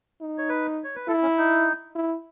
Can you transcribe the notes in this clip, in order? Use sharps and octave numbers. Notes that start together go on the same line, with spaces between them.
D#4
C#5
B4
C#5
B4
E4 A4
C#4
D#4
E4